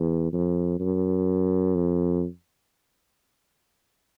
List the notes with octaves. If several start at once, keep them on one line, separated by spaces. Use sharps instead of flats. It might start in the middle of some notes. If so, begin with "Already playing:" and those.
Already playing: E2
F2
F#2
F2